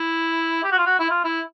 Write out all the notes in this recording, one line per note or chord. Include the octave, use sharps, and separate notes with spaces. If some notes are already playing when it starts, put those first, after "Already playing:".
Already playing: E4
G4
F#4
F4
F#4
E4
F4
E4